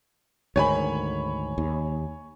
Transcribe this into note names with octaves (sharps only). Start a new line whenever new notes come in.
D2 G#2 D#3 C#5 G#5 B5
D#2